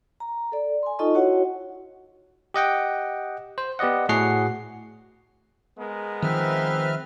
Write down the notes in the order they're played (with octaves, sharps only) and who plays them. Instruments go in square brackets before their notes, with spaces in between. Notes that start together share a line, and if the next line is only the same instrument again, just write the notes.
[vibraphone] A#5
A4 D5
G#5 C6
D#4 F4 A4 D#5 A5 C#6
E4 F#4 C#5 F#5
[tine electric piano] G4 D#5 F#5 G5
C5
B3 G4 D5 D#5 F#5
A2 F#4 G#4 F#5 C7
[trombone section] G#3 B3 A#4
[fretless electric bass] D#3 F3 [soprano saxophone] C4 [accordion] B4 E5 F6